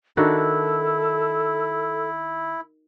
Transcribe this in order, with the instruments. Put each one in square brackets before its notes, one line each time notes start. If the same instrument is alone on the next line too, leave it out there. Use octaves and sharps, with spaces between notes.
[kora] D#3 D4 F#4 [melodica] E4 [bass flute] A4